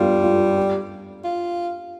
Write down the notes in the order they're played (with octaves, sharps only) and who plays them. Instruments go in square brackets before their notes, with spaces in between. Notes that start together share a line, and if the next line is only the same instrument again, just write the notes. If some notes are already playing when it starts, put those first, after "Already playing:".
Already playing: [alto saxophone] G3 [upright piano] B3 D4 F4
[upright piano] F4
G4
[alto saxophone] F4